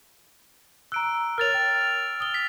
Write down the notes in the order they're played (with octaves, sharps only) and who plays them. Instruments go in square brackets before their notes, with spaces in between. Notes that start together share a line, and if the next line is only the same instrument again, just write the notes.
[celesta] A#5 F#6 [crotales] E6 D7
[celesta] A#4 C#5 [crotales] F6 A6 F7
[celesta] G5
D#6 G7
[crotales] B6